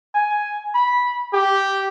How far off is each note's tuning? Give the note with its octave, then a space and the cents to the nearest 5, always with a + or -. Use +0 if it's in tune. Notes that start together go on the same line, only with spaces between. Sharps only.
G#5 +5
B5 -10
G4 -5